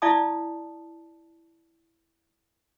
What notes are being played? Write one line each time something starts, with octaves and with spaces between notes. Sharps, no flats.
E4 D5 F5 A5 D#6